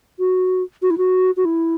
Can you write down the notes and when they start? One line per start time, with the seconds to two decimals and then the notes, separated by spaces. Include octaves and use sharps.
0.19 F#4
0.82 F#4
0.90 E4
0.98 F#4
1.37 F#4
1.45 E4